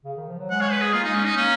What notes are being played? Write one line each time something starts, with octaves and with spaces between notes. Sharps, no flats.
C#3
D#3
F3
F#3
G#3 F#5
C#5
B4
G#4
A#3 F4
D#4
G#3
C#4
D#4
A#3 C#4